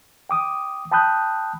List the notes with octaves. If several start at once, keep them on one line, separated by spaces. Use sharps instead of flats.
G5 D6 D#6
G5 A5 B5 D#6 F#6 G6